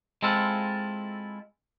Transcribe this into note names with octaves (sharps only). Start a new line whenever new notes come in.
G#3 C4 E4 F4 A4